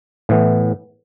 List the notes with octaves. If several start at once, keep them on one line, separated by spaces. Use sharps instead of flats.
A2 E3 B3